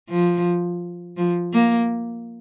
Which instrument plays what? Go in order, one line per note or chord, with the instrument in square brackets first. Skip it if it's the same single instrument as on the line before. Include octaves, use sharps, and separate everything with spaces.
[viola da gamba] F3
F3
A#3